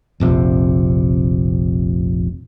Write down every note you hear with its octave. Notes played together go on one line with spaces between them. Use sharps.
F1 A#1 C3